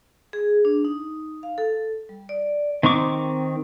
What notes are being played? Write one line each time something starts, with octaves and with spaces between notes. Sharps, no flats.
G#4
D4
D#4
F5
A4
G3
D5
D#3 C4 D#4 C#6 D6